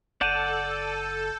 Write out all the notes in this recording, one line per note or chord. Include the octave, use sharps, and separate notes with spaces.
F#1 A4 D5 F#5 A5 G6 D#7